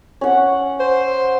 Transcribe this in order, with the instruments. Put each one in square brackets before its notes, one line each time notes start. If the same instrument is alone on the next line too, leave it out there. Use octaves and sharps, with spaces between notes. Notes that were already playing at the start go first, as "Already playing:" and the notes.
[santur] C#4 F#5
[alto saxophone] C5